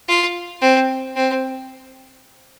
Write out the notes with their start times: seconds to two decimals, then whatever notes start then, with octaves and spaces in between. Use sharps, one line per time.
0.08 F4
0.62 C4
1.16 C4